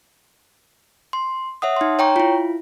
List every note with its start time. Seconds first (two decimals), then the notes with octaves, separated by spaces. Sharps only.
1.13 C6
1.62 C#5 E5 F#5 D#6
1.76 D#4 C6
1.99 C#5 G5 A#5 C#6
2.16 E4 F4